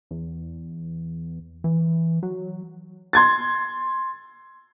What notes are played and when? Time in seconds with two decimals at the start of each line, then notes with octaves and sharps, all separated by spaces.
0.11 E2
1.64 E3
2.23 F#3
3.13 C6 G#6 A6